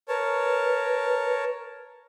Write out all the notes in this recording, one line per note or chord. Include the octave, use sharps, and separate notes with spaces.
A#4 B4 C#5 A5